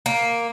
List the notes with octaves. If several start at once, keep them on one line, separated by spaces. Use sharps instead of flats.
A#3